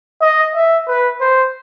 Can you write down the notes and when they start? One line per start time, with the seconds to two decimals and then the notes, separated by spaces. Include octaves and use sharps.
0.22 D#5
0.55 E5
0.87 B4
1.21 C5